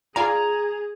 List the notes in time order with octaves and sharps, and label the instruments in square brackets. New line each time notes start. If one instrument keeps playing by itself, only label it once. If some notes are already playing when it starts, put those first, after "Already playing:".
[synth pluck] F4 D5 G#5 [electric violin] G#4 [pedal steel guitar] A#5